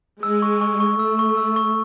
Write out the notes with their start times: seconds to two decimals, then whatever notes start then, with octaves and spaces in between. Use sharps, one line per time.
0.23 G#3 E6
0.42 C#6
0.61 C#6
0.80 C#6
0.99 A3 E6
1.19 C#6
1.37 E6
1.56 C#6